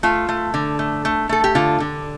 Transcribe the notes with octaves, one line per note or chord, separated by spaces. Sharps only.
A3 F4
A3
D3
A3
A3
A3 A4
G4
D3 F4
D3